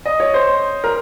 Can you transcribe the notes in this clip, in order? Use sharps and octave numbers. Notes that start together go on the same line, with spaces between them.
D#5
C#5
C5
A#4